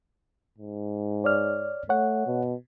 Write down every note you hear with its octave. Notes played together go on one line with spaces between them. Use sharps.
G#2
C#5 D5 F6
A3 C#5 F#5
B2